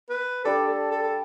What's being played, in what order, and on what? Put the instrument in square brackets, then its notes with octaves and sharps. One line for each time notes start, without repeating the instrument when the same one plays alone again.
[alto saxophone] B4
[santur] G3 D4 G4 D5 [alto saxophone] A4
[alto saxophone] A4
A4
A4